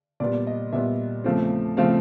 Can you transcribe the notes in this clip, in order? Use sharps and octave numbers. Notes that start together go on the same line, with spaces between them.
A#2 G3 B3 D5
D#5
A#2 G3 B3 E5
E2 C#3 F3 A3 C4
C#3 F3 A3 C4 F5